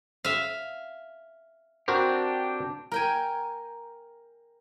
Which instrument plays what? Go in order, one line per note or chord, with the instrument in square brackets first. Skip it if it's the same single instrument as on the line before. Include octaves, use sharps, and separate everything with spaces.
[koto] E5 F5
[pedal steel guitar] C4 D4 G4 [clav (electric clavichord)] F#4 A#4 C5
[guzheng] A#4 G5 G#5